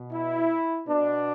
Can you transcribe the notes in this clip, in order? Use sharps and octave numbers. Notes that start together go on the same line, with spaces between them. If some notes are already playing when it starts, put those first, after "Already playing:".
Already playing: B2
E4
B2 D4